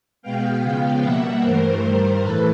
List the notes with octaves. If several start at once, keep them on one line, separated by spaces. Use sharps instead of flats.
B2 G#3 B3 F5 G5
C#3 F3 G#3 B3
B2 G3 A#3 E5 F#5
G2 E3 A3 A#4 C5
G2 D#3 G3
A2 E3 A4 B4